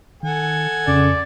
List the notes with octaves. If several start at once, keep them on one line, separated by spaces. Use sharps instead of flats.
D#3 A4 F#5 G#5
F2 C#3 D5